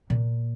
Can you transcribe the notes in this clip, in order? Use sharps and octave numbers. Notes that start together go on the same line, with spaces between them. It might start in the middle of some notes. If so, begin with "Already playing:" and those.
A#2